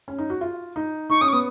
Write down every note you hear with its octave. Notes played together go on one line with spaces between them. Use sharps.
C#4
D#4
F#4
F4
D#4
D#4 C#6
C#4 D#6
C#6
B3 D#6